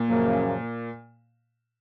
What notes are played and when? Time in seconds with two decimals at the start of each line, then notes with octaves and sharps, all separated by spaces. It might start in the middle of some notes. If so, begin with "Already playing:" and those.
Already playing: A#2
0.09 F#2 C#3 F3 A#3